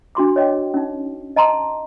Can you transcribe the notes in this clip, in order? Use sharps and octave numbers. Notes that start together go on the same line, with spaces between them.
D4 F#4 C6 D6
C#5 D#5 G5
C#4 D#4
D#5 A5 A#5 C6